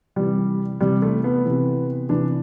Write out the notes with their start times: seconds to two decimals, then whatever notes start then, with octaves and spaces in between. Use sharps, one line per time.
0.16 C3 E3 G3
0.81 C3 E3 G3
1.02 A3
1.24 B3
1.45 C3 E3
2.09 C3 E3 D4